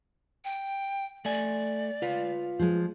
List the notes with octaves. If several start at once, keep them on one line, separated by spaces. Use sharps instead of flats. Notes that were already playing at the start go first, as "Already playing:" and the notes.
G5
A3 D5 G#5
F4 B4 F5
F3 G#3